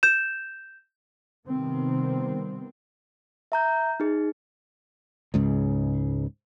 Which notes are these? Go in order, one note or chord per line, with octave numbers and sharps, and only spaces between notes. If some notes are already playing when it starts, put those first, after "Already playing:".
G6 E7
C3 D#3 G3 B3 C4
E5 A#5 G6
D#4 G#4
C#2 G#2 C#3